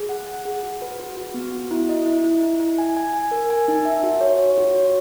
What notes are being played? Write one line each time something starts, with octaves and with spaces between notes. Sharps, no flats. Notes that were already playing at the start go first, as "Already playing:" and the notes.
Already playing: G#4
F#5
F#5
G#4
F#4
B4
F#4
F#4
B3
F#4
E4
D#5
E4
E4
E4
E4
G#5
G#5
G#5
A#4
G#5
D#4
E5
F#4
C#5
C#5
F#4
C#5